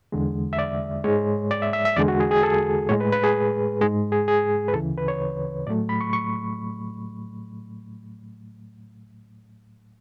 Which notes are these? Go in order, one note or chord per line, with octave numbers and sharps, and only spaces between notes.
E2 D3 G#3
E5
D5
G#2 G#3 C#5
D5
E5
E5
E5
E2 D3 G#3 D5
F#4
G#4
G#4
A4
A2 G#3 C#5
B4
B4
G#4
G#2 G#3 G#4
G#4
G#4
B4
D2 C#3 E3 A4
B4
C#5
A2 F#3 A3 D5
B5
C#6
C#6